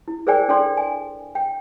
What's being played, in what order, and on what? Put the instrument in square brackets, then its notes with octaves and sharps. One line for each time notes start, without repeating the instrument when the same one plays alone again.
[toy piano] E4
G#4 A#4 C5 D5 G5 G#5
D4 A4 D5 G5 C6
G#5
G5